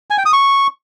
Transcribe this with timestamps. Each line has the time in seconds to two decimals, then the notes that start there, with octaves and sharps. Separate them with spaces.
0.10 G#5
0.18 G5
0.26 D#6
0.33 C#6